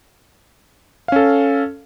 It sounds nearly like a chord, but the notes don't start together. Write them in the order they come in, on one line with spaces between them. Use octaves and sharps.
F5 C#4 A4